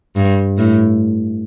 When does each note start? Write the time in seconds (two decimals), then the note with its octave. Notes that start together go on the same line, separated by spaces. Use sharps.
0.16 G2
0.58 A2